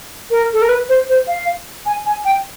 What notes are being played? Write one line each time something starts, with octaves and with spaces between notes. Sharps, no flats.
A#4
A4
A#4
B4
C5
C5
F5
G#5
G#5
G5